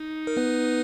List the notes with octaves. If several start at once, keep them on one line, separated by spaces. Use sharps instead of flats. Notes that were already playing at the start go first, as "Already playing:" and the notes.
Already playing: D#4
A#4
B3 B4